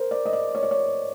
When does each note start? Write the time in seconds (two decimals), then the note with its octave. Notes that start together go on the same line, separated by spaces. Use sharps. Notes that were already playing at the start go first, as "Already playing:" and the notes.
Already playing: A#4 C5
0.11 D5
0.26 D#5
0.33 D5
0.55 C#5
0.63 D5
0.71 C#5